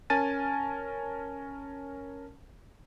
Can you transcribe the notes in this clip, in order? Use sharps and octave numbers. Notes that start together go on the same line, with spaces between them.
C#4 A#4 G#5 A5 A6 D#7